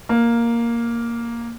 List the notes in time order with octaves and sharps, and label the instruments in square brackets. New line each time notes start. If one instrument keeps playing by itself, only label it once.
[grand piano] A#3